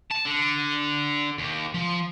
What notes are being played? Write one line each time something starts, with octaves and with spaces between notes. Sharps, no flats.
A5
D3
D#2
F3